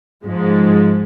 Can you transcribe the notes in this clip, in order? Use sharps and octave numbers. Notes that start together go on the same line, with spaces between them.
G#2 F3 G#3